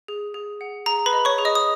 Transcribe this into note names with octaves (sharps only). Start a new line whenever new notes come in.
G#4
G#4
F#5
G#4 A#5
B4 B5
D#5
C#5 C#6
G#4
D#5 D#6
D#6